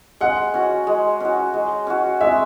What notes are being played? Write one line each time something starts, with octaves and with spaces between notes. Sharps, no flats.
G#3 F#5
C#4 F#4
G#3
C#4 F#4
G#3
C#4 F#4
G#3 E5